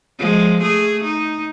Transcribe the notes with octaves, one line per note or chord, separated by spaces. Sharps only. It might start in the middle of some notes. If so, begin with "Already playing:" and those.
F3 G#3
A3 G#4
D#4